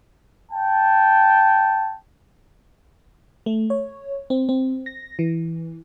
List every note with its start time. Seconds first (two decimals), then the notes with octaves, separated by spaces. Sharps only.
0.51 G5 A5
3.46 A3
3.70 C#5
4.30 C4
4.49 C4
4.86 A#6
5.19 E3